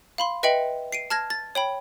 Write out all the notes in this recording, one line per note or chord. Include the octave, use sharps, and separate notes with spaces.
F5 B5 C6
B4 D#5 E5 G5 C#7 F#7
C7 D7 D#7
A5 F6 G#6 A#6
A6
C#5 G5 B5